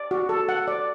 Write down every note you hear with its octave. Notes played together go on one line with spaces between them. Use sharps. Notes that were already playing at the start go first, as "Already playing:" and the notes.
Already playing: D5
F#4
A4
F#5
D5